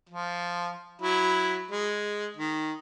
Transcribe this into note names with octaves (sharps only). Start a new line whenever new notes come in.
F3
F#3 E4 B5
G#3
D#3